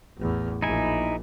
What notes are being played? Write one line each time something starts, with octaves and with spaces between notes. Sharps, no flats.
A1 E2
A#1 A#2 D#4 E4 G#5